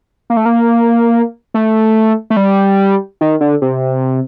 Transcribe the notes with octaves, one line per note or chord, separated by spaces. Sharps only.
A#3
A3
A#3
A3
A3
G3
D#3
D3
C3